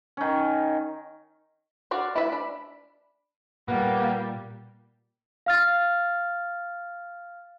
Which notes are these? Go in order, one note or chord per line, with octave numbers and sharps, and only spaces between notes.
D#3 C#4
D4 F#4 D5 F5
E4 B4 D5 E5
D4 B5
A#2 G3 A#3 B3 A#4
F5 F6 A6